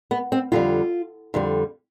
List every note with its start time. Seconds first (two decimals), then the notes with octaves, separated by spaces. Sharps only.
0.11 B3
0.32 C4
0.52 F2 D3 G3 F4
1.34 F2 D3 G3